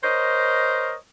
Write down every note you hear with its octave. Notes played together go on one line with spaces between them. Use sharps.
A#4 C5 C#5 D#5